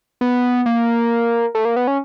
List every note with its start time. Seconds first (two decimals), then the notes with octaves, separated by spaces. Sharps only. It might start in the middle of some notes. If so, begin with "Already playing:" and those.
0.21 B3
0.66 A#3
1.55 A3
1.65 A#3
1.76 B3
1.87 C#4